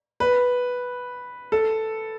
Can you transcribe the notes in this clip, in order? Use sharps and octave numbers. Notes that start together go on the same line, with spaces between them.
B4
A4